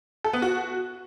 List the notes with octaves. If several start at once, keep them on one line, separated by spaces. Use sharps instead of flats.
A4
B3
F#4